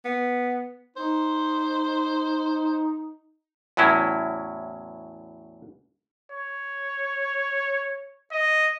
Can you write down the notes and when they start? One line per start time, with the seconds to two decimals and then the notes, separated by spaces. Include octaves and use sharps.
0.05 B3
0.97 D#4 C5
3.77 E2 A2 F#3 C#4 E4
6.32 C#5
8.32 D#5